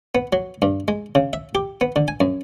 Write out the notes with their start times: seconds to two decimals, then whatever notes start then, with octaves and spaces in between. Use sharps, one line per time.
0.15 B3
0.33 F#3
0.62 G2
0.88 G#3
1.15 C#3
1.33 E5
1.55 G4
1.81 B3
1.96 D3
2.08 G#5
2.21 F#2